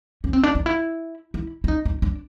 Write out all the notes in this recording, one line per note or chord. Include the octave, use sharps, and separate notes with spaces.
C#4
C4
D4
D#4
E4
E4
E4
D#4
D#4
D4